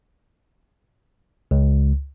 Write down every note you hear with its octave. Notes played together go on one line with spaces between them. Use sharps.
C#2